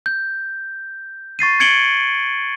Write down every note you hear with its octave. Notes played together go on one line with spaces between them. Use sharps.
G6
C#6 A6 C7 D#7
G#6 C#7 D7 F#7 G7